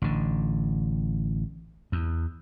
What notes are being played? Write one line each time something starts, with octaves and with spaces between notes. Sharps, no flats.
A1 D3
E2